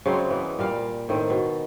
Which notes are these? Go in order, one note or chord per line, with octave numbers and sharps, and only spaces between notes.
C#3 F#3 G#3 C4
E3 B3
A#2 G3 F5
A2 D#3 C4
B2